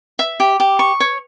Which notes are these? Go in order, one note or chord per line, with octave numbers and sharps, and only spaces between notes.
E5
G4
G4
C#6
C#5